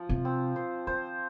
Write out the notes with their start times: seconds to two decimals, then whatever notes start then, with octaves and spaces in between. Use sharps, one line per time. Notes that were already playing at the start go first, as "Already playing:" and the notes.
Already playing: F3
0.09 C3
0.25 C4
0.56 C5
0.87 D#3 C5